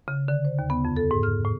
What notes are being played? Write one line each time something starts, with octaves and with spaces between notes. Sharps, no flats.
C#3
D3
C5
D#2
B3
F2
A4
G#2
F6
A2